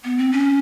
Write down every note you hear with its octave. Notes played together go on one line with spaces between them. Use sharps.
B3
C4
C#4